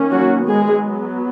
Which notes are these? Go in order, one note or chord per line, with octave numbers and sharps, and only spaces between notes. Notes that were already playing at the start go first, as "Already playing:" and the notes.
Already playing: D#3 A#3 C#4
F#3 F#4
F#3 G#3 B3 G#4